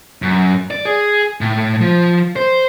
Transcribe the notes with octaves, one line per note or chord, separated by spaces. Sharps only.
F#2
D5
G#4
A2
F3
C5